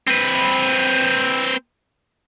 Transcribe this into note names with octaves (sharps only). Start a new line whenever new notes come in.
C4 B4